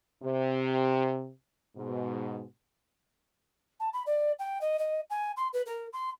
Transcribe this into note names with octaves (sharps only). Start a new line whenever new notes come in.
C3
G#2 B2
A5
B5
D5
G5
D#5
D#5
G#5
C6
B4
A#4
C6